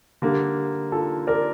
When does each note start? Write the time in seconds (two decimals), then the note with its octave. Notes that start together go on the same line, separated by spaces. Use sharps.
0.22 D3 G3 A#3
0.92 F4 A4
1.27 A#4 D5